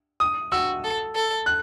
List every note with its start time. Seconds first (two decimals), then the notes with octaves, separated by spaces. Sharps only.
0.20 D#6
0.52 F#4 E6
0.84 A4
1.15 A4
1.46 F#6